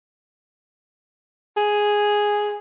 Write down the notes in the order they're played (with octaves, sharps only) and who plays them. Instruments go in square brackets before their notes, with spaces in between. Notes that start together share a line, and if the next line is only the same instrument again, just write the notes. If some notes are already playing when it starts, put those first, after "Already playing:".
[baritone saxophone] G#4